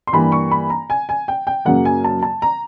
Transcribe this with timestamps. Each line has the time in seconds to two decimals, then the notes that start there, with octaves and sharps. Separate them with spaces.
0.07 C6
0.13 G2 E3 G3 A#3 B5
0.32 C#6
0.51 B5
0.70 A#5
0.90 G#5
1.09 G#5
1.28 G5
1.47 G5
1.65 F#2 C#3 F#3 A#3 F#5
1.85 G#5
2.04 A5
2.23 A5
2.42 A#5